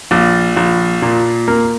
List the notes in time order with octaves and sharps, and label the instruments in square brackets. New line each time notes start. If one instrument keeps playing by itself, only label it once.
[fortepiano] A#1
A#1
A#2
A#3